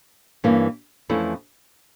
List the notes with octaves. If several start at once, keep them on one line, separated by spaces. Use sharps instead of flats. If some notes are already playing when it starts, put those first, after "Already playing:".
G2 E3 A#3 C#4
F2 E3 A3 C#4 E4